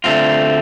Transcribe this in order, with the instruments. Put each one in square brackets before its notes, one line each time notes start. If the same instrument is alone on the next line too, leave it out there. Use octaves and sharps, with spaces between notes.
[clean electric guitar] D3 A3 C4 F4